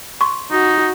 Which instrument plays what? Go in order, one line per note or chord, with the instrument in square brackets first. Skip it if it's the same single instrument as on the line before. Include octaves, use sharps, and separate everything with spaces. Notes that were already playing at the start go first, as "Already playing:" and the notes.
[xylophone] C6 C#6
[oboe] D#4 [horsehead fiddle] F#4